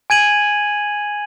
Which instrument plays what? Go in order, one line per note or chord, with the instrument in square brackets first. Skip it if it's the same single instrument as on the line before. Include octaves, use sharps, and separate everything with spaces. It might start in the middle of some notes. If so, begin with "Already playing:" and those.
[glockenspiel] G#5 G#6 D#7 F#7